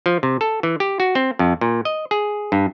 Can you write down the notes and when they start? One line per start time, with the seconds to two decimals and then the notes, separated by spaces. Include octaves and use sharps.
0.06 F3
0.23 C3
0.41 A4
0.63 E3
0.80 G4
1.00 F#4
1.15 C4
1.39 F2
1.61 A#2
1.85 D#5
2.11 G#4
2.52 G2